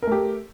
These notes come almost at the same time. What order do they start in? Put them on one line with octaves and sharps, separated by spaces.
A#4 A3 G4